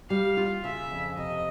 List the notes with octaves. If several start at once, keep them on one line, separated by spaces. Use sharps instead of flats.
G3 F5
F4
C#3 E5
F2
C3 D#5